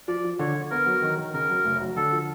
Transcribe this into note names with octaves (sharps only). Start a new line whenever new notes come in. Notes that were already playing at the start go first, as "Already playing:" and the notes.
F3 D5
F3
D3 C#5
D3
B3 A#4
F#3
D#3
D#3
C#3 A#4
F#3
F1
F#3
D3 A4
F3